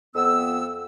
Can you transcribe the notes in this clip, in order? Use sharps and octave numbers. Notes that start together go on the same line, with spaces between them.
F2 B3 E6